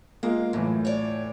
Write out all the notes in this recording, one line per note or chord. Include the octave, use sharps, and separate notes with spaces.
G#3 A#3 F4
F#2 A2 E3
C#5 D5